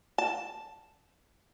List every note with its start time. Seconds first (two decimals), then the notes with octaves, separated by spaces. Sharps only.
0.18 A5